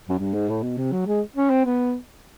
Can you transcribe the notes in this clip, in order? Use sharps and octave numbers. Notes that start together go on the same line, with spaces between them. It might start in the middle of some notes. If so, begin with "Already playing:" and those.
F#2
G2
G#2
A2
B2
C3
F#3
G#3
C#4
C4
B3